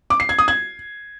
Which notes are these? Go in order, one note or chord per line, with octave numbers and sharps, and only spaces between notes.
D6
C7
G#6
D#6
G#6